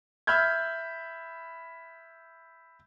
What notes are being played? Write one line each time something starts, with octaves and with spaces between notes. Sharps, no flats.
E5 B5 F6 G6 G#6